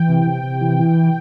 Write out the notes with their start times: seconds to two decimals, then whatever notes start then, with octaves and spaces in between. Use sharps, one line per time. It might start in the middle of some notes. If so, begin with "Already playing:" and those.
Already playing: E3 G5
0.09 C3
0.26 C3
0.43 C3
0.61 E3
0.79 E3